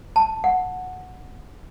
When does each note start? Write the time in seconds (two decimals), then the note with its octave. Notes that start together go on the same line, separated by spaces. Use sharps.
0.16 A5
0.44 F#5